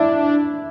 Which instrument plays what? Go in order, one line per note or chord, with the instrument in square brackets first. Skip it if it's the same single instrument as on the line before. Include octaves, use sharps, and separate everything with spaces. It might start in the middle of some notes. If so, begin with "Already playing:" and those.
Already playing: [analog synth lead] D4 [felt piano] E4